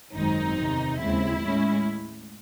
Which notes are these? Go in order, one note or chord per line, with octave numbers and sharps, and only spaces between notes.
G#1 F#2 D#3 G#3 C4 D#4
E2 C3 D#3
D#2 C#3 G#3 C4 E4
A2 G#3 C#4